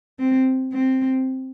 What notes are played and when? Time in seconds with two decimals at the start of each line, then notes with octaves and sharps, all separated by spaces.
0.19 C4
0.73 C4